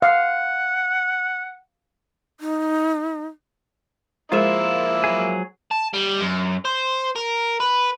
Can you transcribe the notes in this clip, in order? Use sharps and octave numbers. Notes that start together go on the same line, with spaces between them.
F5 F#5
D#4
F3 G#3 A#3 E4 F4 A#4 E5
F#3 G#4
A5
G3
F#2
C5
A#4
B4